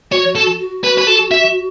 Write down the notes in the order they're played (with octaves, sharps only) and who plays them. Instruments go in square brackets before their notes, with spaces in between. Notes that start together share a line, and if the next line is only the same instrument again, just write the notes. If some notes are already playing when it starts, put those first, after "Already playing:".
[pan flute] F#4 [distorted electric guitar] C#5
[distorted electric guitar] A4
[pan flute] F#4
[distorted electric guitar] B4
B4
A4
E5